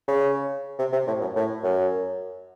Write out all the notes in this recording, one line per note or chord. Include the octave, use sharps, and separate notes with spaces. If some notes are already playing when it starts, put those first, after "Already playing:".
C#3
C3
C3
A2
F#2
A2
F#2